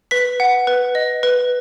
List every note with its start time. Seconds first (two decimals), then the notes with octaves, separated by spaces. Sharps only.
0.11 B4 B6
0.40 F#5
0.67 B4
0.95 D#5
1.23 B4